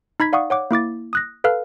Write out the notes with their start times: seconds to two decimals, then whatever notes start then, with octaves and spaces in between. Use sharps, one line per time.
0.20 D#4 B5 G#6 B6
0.33 D5 F5 F#5 C#6 D#6
0.50 C#5 F#5 D6
0.71 A#3 E4 D6 A6
1.13 D#6 F#6 A#6
1.44 A4 B4 F5 F6